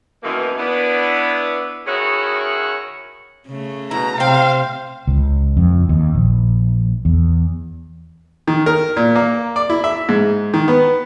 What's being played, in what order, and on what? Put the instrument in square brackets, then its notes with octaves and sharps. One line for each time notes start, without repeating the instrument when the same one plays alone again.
[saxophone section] F#2 B2 D#3 E3 A#3 B3
B3 D4 E4
D#3 C#4 E4 F#4 G#4 C#5
[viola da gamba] C#3 A3
[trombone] B2 [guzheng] E4 [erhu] A#5
[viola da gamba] C3 [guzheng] C4 G5 [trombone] C5 [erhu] F5
[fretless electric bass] C#2
F2
D#2
A#1
E2
[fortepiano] D#3
A#4
A#2
A#3
D5
E4
E5
G#2
D#3
B3